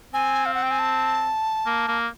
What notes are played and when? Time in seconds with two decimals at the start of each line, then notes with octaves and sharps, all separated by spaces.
0.13 C4 G#5
0.46 F5
0.54 F#5
0.62 G5
0.71 G#5
0.79 A5
1.66 A#3
1.88 A#3